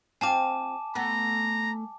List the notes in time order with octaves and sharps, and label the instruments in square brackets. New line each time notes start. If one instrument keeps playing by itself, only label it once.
[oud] C4 F4 [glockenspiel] G#5 A5 D6
[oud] A3 B3 [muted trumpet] A#5